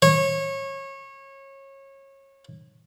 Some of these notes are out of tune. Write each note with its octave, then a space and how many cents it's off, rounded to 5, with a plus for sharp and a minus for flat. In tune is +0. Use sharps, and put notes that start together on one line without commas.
C#5 -25